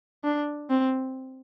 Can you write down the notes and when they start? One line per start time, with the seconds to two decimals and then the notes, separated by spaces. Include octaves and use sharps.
0.24 D4
0.70 C4